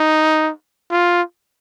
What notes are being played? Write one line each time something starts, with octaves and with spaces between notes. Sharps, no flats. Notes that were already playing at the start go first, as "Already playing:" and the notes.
Already playing: D#4
F4